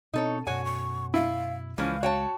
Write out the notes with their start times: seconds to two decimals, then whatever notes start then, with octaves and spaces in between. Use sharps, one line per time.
0.14 B2 C4 D#4 A4 C#5
0.47 F#2 B2 F#4 C#5 F#5 G#5
0.65 C#6
1.14 E4 F5
1.78 C#2 E3 F3 G#3 C#4 F5
2.03 F#4 C#5 G5 A5